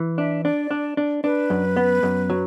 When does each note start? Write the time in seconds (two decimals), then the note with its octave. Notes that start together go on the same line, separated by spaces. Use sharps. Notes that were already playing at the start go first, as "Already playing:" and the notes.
Already playing: E3
0.18 D4 E5
0.45 D4 D5
0.71 D4
0.97 D4
1.24 D4 B4
1.50 F#2
1.76 B3
2.03 F#2
2.30 F#3